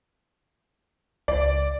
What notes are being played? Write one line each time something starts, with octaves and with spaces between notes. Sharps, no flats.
C#2 D5